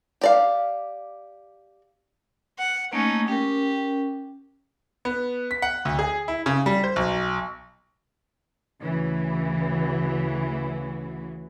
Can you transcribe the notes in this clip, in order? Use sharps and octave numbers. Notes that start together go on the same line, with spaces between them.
G4 D5 F5
F#5
A3 A#3 C#4 D#4
C#4 G4 A#4
B3
B6
F#5
D2
G#4
E4
C#3
G3
C5
B1
D2 C#3 E3 F#4